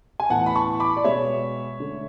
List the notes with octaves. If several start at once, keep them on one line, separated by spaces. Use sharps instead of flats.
G#5
A2 E3 B3 F#5 A5
B5
A5 C#6
B5 D6
D5
B2 G#3 B3 C#5 E5
D3 A3